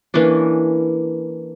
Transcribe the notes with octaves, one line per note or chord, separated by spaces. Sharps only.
E3 A#3 C#4 D4